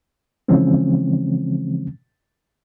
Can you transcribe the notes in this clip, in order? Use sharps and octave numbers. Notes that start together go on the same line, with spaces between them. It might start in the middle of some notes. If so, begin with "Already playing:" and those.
C#3 E3 F3 G#3 C4 C#4